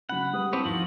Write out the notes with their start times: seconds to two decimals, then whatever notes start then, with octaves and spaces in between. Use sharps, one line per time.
0.09 C#3 F#3 F#5 B5
0.33 G3 G#3 B4 D#6
0.53 C4 E4 B4 C#5 A5 D6
0.64 D#2 A2 F3 F4 F#4 F#7